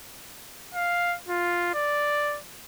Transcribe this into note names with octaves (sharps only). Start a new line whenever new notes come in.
F5
F4
D5